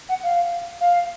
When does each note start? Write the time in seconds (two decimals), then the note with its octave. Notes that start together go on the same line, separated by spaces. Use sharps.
0.09 F#5
0.23 F5
0.81 F5